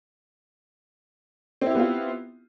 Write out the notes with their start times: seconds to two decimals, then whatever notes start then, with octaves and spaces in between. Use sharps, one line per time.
1.61 C4
1.66 E4
1.70 G4
1.75 B3
1.79 F4